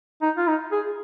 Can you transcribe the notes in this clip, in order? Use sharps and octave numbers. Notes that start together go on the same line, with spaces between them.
D#4
F4
D#4
G#4